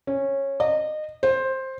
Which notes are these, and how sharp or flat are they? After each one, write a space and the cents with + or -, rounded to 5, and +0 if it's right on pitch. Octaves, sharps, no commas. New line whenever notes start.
C#4 -15
D#5 -25
C5 +10